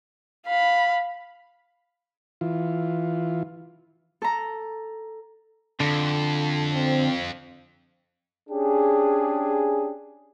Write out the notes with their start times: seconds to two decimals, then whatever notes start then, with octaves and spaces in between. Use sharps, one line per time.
0.47 F5 B5
2.41 E3 F4
4.22 A4 A#5
5.80 F2 D3
6.72 C4
8.50 C#4 D4 G4 G#4